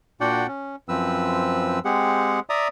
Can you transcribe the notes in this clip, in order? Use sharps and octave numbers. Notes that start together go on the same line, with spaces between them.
A#2 D4 F#4 D5 F#5 G5
C#4
F#2 F3 C4 B4 E6
G#3 C4 G4 G#4 F#5
D5 E5 A#5 D#6